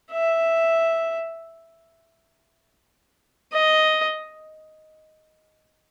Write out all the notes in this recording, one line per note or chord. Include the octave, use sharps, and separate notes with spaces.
E5
D#5